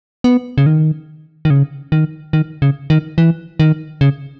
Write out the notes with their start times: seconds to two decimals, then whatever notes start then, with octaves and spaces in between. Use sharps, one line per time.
0.24 B3
0.58 C#3
0.66 D#3
1.45 D#3
1.50 C#3
1.92 D#3
2.33 D#3
2.62 C#3
2.90 D#3
3.18 E3
3.60 D#3
4.01 C#3